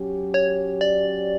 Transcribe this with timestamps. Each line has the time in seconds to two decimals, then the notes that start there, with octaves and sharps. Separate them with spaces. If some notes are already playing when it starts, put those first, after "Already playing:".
Already playing: F#3 C#4 G4
0.34 C#5
0.81 D5